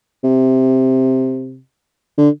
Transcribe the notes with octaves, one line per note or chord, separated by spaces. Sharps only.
C3
D3